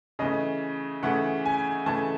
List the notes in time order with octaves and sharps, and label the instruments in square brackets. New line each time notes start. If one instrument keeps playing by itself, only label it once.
[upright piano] C#3 E3 A3 D#5
C#3 E3 A3 F#5
G#5
C#3 E3 A3 A5